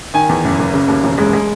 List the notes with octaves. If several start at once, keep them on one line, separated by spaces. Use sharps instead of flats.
D#3 G#5
E2
F#1
F#1
C#3
D#2
E1
G#3
G#3